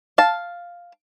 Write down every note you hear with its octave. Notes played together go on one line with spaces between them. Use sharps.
F5 A5